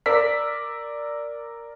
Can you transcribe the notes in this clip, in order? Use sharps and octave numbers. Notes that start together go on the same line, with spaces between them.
A#4 D5 E6 B6